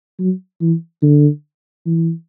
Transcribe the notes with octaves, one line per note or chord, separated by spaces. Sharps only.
F#3
E3
D3
E3